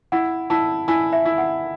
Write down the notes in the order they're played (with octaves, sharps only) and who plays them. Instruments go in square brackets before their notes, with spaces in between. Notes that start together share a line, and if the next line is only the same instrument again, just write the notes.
[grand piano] E4 [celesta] F#5
[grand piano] E4 [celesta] A5
[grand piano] E4 [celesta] G#5
[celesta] E5
[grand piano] E4
[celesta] F#5